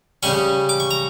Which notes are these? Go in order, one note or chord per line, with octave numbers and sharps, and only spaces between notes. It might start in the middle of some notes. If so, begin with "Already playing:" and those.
C#3 G3 C#4 C#6
D6
C#6
A#5